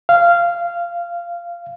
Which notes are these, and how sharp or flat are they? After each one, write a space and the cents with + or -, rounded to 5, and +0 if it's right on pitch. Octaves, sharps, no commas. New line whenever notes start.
F5 -15